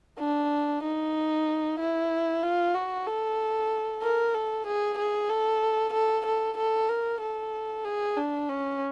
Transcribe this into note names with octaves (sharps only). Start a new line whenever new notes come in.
D4
D#4
E4
F4
F#4
A4
A#4
A4
G#4
G#4
A4
A4
A4
A4
A#4
A4
G#4
D4
C#4